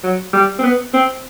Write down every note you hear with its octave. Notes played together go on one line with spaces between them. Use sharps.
F#3
G3
C4
B3
C4